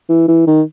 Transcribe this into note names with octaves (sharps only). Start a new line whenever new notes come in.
E3
E3
D#3